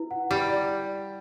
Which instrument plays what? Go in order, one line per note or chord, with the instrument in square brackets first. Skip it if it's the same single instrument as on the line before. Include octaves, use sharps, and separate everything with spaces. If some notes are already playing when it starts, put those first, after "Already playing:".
Already playing: [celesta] E4 B4
F#5
[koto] G3 [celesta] E4
[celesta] D5